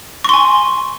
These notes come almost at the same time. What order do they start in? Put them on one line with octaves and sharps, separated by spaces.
C#6 C6 G#5